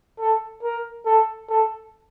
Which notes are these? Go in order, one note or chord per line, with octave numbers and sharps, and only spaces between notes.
A4
A#4
A4
A4